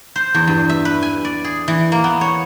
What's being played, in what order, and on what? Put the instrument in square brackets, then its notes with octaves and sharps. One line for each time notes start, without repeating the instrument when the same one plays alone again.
[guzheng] C5
E2
G2
E5
B4
G#5
D5
G#4
E3
A#3
B3
C#5